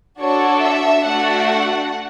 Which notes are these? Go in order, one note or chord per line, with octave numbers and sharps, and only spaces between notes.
D4 F#4 A4 C#5
E5
A3 D4 F#4 F#5